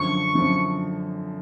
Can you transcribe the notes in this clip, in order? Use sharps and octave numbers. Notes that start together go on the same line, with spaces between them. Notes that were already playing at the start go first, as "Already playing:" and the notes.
Already playing: F#2 D3 F3 C#6
F#2 D3 F3